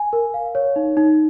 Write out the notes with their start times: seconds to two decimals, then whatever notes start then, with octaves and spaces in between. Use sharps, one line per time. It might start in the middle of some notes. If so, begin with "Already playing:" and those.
Already playing: G#5
0.13 A#4
0.34 F5
0.55 C#5
0.76 D#4
0.97 D#4